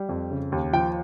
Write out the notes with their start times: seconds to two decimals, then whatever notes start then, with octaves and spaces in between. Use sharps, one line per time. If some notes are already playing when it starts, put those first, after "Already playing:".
Already playing: G3
0.09 F2
0.31 C#3
0.52 D#2
0.73 F3 G5